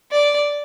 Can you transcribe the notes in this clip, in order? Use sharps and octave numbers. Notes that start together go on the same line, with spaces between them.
D5